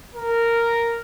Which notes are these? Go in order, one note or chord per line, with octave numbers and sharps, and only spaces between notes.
A#4